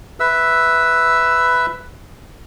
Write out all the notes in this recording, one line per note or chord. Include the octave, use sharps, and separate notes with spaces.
B4 E5 E6